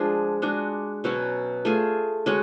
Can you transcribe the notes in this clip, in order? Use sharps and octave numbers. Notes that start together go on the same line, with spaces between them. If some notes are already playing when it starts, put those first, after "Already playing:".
Already playing: F3 G#3 D4 G#4
G#3 D4 F#4
B2 F#3 C#4 F#4
A3 F4 G#4
G#3 C#4 F#4